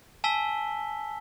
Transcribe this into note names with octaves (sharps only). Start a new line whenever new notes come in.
G#5 A5 E6 B6 G7